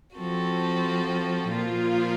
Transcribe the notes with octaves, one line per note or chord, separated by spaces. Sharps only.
F3 C4 F#4 A4
A#2 F3 A#3 F4